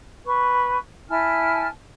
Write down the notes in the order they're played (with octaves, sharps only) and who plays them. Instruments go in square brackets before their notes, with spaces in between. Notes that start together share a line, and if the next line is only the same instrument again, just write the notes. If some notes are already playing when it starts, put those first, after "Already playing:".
[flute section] B4 C#6
E4 G#5 A5 F6